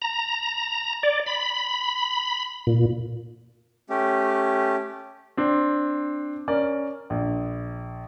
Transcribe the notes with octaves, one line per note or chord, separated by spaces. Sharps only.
A#5
D5
B5
A#2
A3 C#4 G4
C4 D4
C#4 A#4 D5
A#1